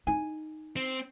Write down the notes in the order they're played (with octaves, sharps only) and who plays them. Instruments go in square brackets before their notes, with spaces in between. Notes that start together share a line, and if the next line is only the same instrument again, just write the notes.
[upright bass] D#4 [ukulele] G#5
[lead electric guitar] C4